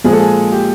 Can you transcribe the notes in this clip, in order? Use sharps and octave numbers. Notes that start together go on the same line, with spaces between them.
A#2 F3 G#3 G#4
A4
G#4
G4